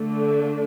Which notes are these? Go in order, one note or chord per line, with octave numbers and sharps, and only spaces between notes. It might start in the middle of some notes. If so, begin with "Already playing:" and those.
Already playing: D3 A3 D4